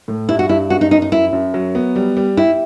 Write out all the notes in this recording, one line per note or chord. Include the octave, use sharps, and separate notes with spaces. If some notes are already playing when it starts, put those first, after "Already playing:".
A2
G2 E4
F#4
G2 E4
F#2 F#4
D#4
F#2 D#4
D#4
F#2 E4
F#2
F#3
B3
G3
G3
E4 G4